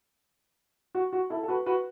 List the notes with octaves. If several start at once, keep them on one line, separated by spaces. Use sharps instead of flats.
F#4
F#4
E4 A4
A4
F#4 B4
F#4 B4